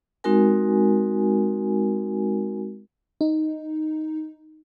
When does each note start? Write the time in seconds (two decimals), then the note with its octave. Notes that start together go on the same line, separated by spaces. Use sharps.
0.24 G#3 C4 D#4 F#4 A#4 G#5
3.21 D#4